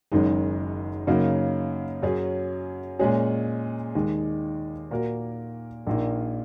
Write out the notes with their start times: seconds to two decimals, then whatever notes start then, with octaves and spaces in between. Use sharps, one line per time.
0.12 F#1 F#2 D#3 G#3 D#4
1.07 F#2 C#3 A#3 D#4 F#4
2.03 F#2 F#3 C#4 G#4
2.99 A#2 G#3 C#4 G#4
3.95 D#2 D#3 G#3
4.91 A#2 A#3 F#4 A#4
5.87 A#1 A#2 A#3 D#4